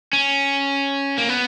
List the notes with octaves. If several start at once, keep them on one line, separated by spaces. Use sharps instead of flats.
C#4
A#3
B3